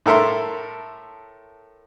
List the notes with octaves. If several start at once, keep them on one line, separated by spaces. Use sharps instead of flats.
A2 A4 A#4 E5 C6